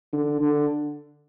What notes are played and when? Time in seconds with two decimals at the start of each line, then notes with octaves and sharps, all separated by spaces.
0.13 D3
0.41 D3